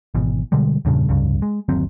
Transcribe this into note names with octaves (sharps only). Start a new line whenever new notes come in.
G#1 B2 E3
B2 D3 G3 G#3
E2 G2 A#2 C#3
F1 C#2 G2 C#3
G#3
G1 D#2 F#3 C4